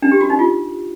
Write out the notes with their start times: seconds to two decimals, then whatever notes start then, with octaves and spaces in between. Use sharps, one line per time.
0.02 D4
0.12 G4
0.21 F#4
0.30 D#4
0.39 F4